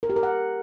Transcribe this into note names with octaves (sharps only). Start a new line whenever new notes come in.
A#4
G4
A#4
F#5